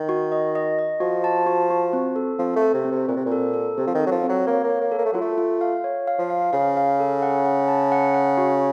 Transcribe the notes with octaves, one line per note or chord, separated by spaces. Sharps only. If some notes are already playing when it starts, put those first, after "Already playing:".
Already playing: D#3
F#4
D#5
D#5
D#5
F3 F#4
A5
F#4
F#4
C4
A4
F3 C4
A3
A4
C3
C4
C3
A#2 C4
C3
A#2
A4
A4
C3 C4
F3
D#3
A4
F#3
F3
C4
F#3
A#3 C#5
A#3
C#5
A#3
A4
A#3
A3
F#3 F4
A3
F4
F5
C#5
F5
F3
F5
C#3 F5
F5
A4
F#5
F#5
A5
F#5
F#5
F#4